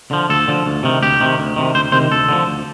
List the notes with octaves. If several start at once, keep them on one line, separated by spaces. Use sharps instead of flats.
D3 F3
D2 A4
D3 F3
D2
C3 D#3
D2 G4
C3 D#3
D2
C3 D#3
D2 C5
C3 D#3 C5
D2 A4
D3 F3
D2